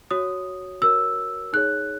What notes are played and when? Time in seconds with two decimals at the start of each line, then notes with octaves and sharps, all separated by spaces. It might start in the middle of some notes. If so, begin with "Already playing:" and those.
0.11 F#4 C#5 D#6
0.81 F#4 A#4 C#5 E6
1.53 D#4 G#4 C#5 F#6